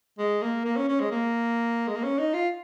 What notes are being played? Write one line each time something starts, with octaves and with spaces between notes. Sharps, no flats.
G#3
A#3
A#3
C#4
C#4
G#3
A#3
G#3
A#3
C#4
D#4
F4